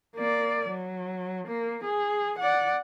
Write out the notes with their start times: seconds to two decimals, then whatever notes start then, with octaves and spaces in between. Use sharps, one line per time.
0.16 A#3 D5
0.70 F#3
1.47 A#3
1.84 G#4
2.39 D5 F#5